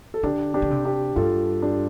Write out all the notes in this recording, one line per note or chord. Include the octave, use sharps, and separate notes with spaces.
A4
D3 D4 G4
D4 G4
D3
C3
D4 G4
G2 F4 A4
D4 G4